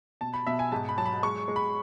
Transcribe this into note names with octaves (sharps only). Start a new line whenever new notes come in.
B2 A5
B5
B2 E5
G#5
G#2 A5
B5
F#3 A5
B5
G#3 C#6
G#3
B5